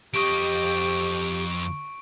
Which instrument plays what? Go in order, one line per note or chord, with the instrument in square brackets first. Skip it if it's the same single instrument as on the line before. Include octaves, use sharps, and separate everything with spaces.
[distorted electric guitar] F2 D#5 [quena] G4 [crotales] C#6 D7